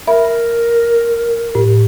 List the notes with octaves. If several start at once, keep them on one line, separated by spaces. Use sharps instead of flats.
A#4 E5 B5
A2